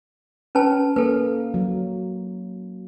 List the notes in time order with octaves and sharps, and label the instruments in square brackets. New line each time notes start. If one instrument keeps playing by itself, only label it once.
[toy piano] C#4 B4 A5
[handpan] A#3 [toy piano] A4 B4
[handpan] F#3